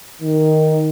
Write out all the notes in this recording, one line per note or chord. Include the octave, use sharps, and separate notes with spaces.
D#3